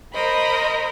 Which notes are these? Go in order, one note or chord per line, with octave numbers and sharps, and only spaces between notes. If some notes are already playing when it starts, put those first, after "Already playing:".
A#4 C5 D#5 B5